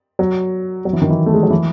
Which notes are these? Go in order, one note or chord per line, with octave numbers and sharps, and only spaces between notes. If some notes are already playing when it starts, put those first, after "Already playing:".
F#3
F#3
E3
D#3
E3
A3
G#3
F#3
E3